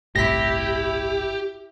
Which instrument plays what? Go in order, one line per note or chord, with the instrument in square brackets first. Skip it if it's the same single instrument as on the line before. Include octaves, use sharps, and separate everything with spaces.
[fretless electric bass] G1 C2 A2 [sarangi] E4 [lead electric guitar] G4 [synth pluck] A#6 B6